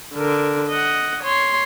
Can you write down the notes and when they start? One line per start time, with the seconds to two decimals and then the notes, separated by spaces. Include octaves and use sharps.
0.15 D3 A#4
0.69 D#5 F#5
1.23 C#5 C6